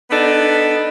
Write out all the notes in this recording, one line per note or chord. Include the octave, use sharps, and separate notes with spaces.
B3 D4 D#4 A4